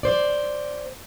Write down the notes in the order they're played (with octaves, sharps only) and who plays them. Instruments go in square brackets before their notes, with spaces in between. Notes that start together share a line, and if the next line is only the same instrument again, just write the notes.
[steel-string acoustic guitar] C5 D5